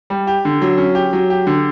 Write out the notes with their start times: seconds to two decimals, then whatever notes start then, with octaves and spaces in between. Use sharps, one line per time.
0.10 G3
0.27 G4
0.45 D3
0.62 F#3
0.78 C#4
0.95 G4
1.13 F#3
1.30 G4
1.47 D3